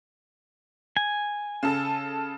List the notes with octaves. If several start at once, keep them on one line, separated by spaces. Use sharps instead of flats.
G#5
C#3 A4